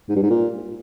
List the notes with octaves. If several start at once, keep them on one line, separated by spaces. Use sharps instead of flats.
G#2
G2
G#2
A#2